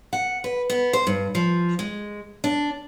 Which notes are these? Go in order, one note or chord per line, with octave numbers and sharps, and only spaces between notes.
F#5
B4
B3
C5
G2
F3
G#3
D4